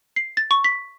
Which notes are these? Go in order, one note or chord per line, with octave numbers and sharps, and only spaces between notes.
C7
A6
C#6
B6